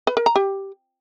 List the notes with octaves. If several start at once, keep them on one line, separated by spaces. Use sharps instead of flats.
B4
A#4
A#5
G4